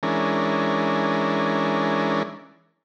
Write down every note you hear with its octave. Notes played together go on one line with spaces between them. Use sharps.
E3 G#3 C#4 D4 A#4